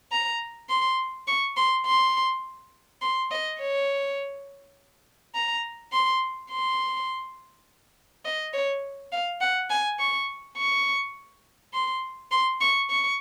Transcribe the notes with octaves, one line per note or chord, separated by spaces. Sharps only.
A#5
C6
C#6
C6
C6
C6
D#5
C#5
A#5
C6
C6
D#5
C#5
F5
F#5
G#5
C#6
C#6
C6
C6
C#6
C#6